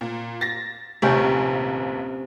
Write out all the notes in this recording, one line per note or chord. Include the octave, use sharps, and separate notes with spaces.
A#2
A6 A#6
F1 A#1 D#2 C3 C#4 G5